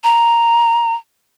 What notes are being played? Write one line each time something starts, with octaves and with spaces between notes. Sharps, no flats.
A#5